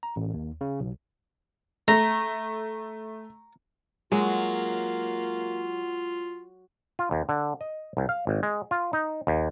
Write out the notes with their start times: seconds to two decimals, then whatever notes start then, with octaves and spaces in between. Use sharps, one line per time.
0.03 A#5
0.16 A1
0.34 D#2
0.61 C#3
0.80 B1
1.88 A3 A#5
4.12 F#3 G#3 A#3 F4
6.99 F4
7.11 D#2
7.29 D3
7.61 D#5
7.97 C2
8.09 F5
8.27 G#1
8.43 G#3
8.71 F4
8.93 D#4
9.27 D#2